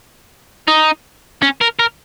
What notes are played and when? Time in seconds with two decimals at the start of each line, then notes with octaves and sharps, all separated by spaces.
0.68 D#4
1.42 C#4
1.61 A#4
1.79 A#4